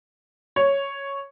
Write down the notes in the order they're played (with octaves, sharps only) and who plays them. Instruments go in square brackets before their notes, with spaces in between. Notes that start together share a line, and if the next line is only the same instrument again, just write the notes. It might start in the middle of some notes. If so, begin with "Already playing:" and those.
[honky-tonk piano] C#5